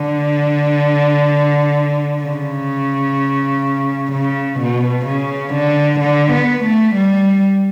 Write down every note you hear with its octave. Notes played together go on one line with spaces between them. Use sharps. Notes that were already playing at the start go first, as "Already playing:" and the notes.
Already playing: D3
C#3
C#3
B2
C#3
D3
D3
B3
A3
G3